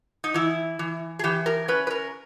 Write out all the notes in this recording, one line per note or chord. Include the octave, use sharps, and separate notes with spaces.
D#4
E3 E4
E3
G#4
E3 G4
A#4
C#4 B4
B4
A#4